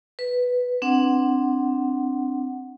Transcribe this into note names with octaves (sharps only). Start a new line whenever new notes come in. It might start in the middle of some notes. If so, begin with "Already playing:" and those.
B4
C4 D4 F#5